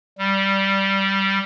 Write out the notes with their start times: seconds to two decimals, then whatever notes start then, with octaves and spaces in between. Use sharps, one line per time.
0.18 G3